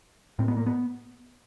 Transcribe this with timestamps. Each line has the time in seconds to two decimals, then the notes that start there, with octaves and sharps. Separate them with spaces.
0.39 A2 C4
0.48 B3
0.57 A#3
0.66 B3